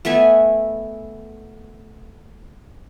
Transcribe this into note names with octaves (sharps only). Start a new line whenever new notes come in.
A3 B3 E5 G#5